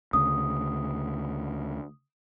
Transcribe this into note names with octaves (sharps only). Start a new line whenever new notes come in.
D2 C#3 D#6